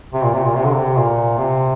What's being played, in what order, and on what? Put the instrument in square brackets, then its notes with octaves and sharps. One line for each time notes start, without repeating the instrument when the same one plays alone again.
[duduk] C3
A#2
C3
A#2
C3
D3
C3
A#2
C3